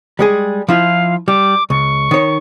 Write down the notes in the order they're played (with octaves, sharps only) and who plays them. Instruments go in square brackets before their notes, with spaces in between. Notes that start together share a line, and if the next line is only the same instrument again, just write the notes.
[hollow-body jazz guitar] G3 G#3 G#4
[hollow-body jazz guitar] F3 E4 F4 [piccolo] F5
[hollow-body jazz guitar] G3 [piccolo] D6
[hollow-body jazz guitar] C#2 [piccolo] C#6
[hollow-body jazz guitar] D#3 C#5